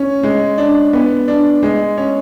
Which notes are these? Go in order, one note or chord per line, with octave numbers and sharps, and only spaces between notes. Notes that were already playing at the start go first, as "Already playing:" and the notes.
Already playing: C#4
G#3
D4
B3
D4
G#3
C#4